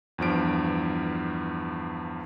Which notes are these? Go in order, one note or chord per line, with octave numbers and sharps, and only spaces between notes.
E2 G2 F3 D7